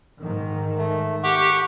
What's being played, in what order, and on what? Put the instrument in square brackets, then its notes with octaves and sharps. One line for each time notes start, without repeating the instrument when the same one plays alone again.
[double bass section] G#2 D#3
[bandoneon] A3
[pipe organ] G4 [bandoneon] F#5 C#6